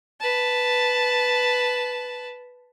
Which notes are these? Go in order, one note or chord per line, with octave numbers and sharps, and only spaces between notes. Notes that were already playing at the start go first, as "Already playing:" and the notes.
B4 A5